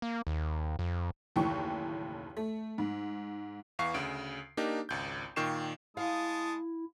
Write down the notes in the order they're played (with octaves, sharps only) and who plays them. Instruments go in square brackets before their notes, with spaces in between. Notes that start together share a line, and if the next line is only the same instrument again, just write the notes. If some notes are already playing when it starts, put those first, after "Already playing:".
[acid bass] A#3
D#2
F2
[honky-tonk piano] F#1 D#2 A2 E3 G5 C#6
A3
G#2
[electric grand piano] E2 E3 F5 C#6 C7
D2 C#3 D7
A#3 D4 D#4 G4
G#1 C#2 G6
A#2 D#3 G5 C#6 C7 E7
[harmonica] G#3 A5 D#6 [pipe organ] E4 [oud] F5